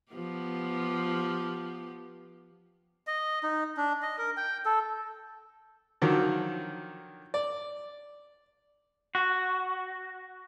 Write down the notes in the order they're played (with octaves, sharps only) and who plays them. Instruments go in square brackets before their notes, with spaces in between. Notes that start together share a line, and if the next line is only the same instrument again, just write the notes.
[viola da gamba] F3 B3 G4
[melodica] D#5
D#4
D4
D#5
A#4
G5
A4
[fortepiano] D3 D#3 F3 F#3
D5
[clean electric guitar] F#4